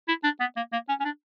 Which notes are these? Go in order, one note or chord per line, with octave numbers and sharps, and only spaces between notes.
E4
D4
B3
A#3
A#3
C#4
C#4
D4